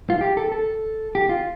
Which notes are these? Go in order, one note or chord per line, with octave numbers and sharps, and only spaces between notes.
F4
G4
A4
A4
G4
F4